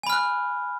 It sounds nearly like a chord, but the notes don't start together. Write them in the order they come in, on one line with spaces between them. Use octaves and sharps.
G#5 B5 F6 F#6